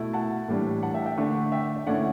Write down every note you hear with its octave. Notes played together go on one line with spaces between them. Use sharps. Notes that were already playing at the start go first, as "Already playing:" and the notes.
Already playing: B2 A3 E4
F#5 A5
A2 E3 G3 D4
F#5 A5
E5 G5
E5 G5
D3 A3 D4
E5 G5
E5
D3 A3 C#4 E4 D5 F#5